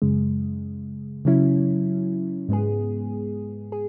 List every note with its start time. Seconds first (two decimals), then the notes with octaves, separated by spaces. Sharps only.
0.02 F#2 C#3 G#3
1.25 C#3 F#3 C#4 E4
2.49 G#2 G#3 B3 G#4
3.72 G#4